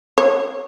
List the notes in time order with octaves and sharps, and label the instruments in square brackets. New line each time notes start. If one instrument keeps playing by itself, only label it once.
[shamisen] C#5